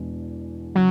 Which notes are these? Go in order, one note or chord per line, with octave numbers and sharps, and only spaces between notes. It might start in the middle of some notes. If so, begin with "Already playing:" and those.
Already playing: E2 B2 G#3 D4
C#3 F#3